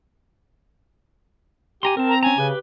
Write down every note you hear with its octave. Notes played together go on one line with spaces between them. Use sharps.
G4 G#5 A#5 C6
C4 A#4 A5
A#5
C#4 G#5 A#5
C#3 G4 B4